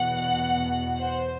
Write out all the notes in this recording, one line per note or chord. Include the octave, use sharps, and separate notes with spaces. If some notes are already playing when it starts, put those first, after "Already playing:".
Already playing: E2 B2 F#5
C5